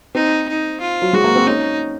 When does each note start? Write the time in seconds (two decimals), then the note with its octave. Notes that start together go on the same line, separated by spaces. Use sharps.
0.15 C4 D#4
0.48 D#4
0.81 F4
1.02 F#3
1.13 G#3 F#4
1.24 A#3
1.36 C4
1.47 C#4 D#4